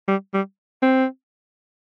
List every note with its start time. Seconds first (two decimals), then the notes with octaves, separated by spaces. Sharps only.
0.08 G3
0.34 G3
0.82 C4